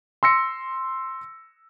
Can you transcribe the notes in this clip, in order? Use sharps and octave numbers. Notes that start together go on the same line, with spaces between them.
C6 E6 A#6 C#7